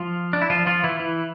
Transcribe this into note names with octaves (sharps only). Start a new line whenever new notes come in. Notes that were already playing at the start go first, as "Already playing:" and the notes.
Already playing: F3 F4
D4
E4
F3 F4
F3 F4
E3 E4
E3 E4